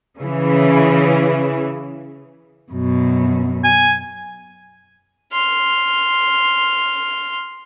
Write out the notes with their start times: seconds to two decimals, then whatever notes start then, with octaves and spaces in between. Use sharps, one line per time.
0.20 C#3 E3
2.72 F#2 B2
3.64 G#5
5.32 C6 F6